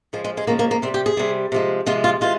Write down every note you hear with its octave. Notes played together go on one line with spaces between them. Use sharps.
C#3 F3 G#3
G#3
G#3
C#3 F3 G#3 A#3
A#3
A#3
C3 G3 C4
G4
G#4
C3 G3
C3 F3 G#3
C3 F3 G#3 F4
F4
E3 G#3 F4